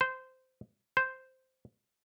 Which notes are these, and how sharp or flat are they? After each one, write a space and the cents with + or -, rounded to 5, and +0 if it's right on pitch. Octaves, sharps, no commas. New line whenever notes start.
C5 -15
C5 -5